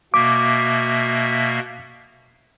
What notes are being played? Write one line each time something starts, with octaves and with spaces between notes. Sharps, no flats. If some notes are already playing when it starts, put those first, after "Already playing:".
B2 A#3 E5 D6